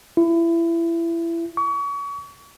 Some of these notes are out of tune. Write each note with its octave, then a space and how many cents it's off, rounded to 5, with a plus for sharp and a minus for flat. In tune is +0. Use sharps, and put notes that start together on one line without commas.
E4 +25
C#6 +35